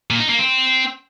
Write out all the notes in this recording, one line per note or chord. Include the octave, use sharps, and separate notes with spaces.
A#2
D#4
A#3
C4